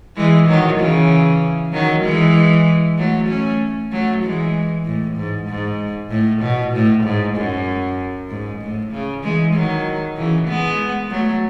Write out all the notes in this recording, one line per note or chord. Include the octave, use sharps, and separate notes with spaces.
E3 G#3
D#3 F#3
C#3 E3
D#3 F#3
E3 G#3
F#3 A3
A3 C#4
F#3 A3
E3 G#3
A2
G#2
G#2
A2
B2
A2
G#2
F#2
G#2
A2
C#3
E3 G#3
D#3 F#3
C#3 E3
G#3 B3
F#3 A3